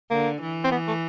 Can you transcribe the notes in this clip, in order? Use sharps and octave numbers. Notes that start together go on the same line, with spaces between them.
D3 A#3
E3
C4
B3
A3